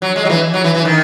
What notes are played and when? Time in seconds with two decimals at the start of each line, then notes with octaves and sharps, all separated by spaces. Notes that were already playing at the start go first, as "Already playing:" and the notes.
0.02 F#3
0.16 G#3
0.25 F#3
0.30 E3
0.54 F#3
0.64 E3
0.74 E3
0.85 D#3